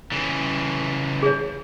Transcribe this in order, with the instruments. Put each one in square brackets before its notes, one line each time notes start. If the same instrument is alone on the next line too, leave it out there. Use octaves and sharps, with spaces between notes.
[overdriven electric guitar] C#3 E3
[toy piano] G#4 C#5